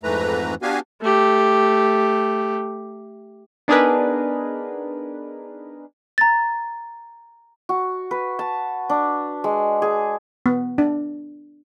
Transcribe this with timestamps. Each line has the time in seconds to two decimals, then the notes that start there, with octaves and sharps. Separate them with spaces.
0.03 F2 G#2 E3 A3 B4 A#5
0.62 B3 D4 F#4 G4 F5 G#5
1.01 A3 G4
3.68 B3 D4 D#4 G#4 A#4 B4
6.18 A#5 A6
7.69 F#4
8.11 B4
8.39 A5
8.90 D4
9.44 G#3
9.82 G#4
10.46 B3
10.78 D4